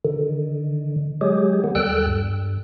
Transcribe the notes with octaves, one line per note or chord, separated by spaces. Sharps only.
D3 D#3
F#3 G#3 G4 G#4
D#3 B3
D#2 G3 A4 G5 E6 F#6
G2